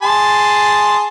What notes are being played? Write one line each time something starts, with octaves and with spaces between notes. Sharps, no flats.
G#4 A5 C6